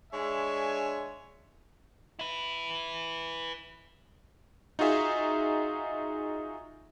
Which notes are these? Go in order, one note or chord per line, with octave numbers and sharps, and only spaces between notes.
G#3 D4 C#5 E5 G#5
E4 B4
D#4 F4 F#4 G#4 E5